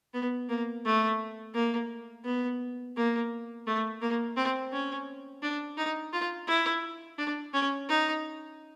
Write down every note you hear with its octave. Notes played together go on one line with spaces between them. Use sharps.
B3
A#3
A3
A#3
B3
A#3
A3
A#3
C4
C#4
D4
D#4
F4
E4
D4
C#4
D#4